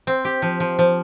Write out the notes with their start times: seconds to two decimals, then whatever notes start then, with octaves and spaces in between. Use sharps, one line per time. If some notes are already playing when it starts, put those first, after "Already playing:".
0.07 C4
0.25 G4
0.42 F3
0.60 F3
0.79 F3